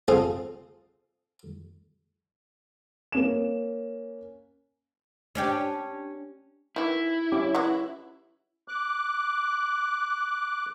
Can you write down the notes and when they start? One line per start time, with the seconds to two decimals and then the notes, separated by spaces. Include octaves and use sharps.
0.08 C4 F4 G#4 A4
3.12 A#3 C#4 E7
5.35 C#4 D4 G4
6.76 D#3 E3 E4
7.32 C#4 G4 D6
7.55 E3 G#3 F#4
8.68 D6 F#6